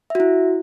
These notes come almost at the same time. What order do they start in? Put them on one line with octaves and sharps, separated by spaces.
E5 F#4 E4